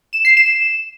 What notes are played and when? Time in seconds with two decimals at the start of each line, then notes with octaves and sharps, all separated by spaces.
0.13 E7
0.25 C7
0.37 E7